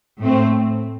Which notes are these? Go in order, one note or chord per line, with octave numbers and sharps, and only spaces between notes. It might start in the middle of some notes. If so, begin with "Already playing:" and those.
A2 A3 C4